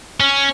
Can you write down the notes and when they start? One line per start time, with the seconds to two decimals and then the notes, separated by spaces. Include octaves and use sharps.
0.20 C#4